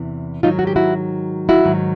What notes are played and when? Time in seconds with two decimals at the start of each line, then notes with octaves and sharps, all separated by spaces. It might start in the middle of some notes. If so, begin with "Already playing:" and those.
Already playing: E2 C3 E3
0.43 G#2 D#3 F#3 D#4 F4
0.59 F#4
0.67 G4
0.76 E4 F#4
1.49 E4 F#4
1.64 G#2 D#3 F#3